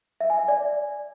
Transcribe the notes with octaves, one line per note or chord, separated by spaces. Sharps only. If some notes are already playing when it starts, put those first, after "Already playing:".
E5
G#5
E5
D5